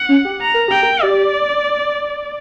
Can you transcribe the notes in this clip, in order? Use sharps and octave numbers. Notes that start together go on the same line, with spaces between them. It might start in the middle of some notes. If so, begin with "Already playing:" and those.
Already playing: F#5
C#4
G4
A#5
A#4
G4 G5
A#4
G4 D5